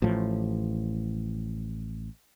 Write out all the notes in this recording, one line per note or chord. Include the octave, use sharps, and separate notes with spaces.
A1 A2 F3